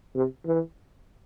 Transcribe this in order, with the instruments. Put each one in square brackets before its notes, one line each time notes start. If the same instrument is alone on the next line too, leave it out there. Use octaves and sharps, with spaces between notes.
[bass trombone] C3
E3